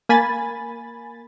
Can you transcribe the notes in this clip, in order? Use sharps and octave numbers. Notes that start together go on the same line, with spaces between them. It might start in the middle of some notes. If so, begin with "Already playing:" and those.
A#3 G#5 B5 A6